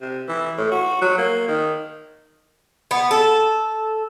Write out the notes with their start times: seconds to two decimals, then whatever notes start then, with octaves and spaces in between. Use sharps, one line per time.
0.01 C3
0.28 E3
0.58 A2
0.72 F#4
1.01 F#3
1.18 A#3
1.48 D#3
2.91 B3
3.11 A4